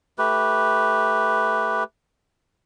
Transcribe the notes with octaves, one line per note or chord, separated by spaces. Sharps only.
A3 G4 B4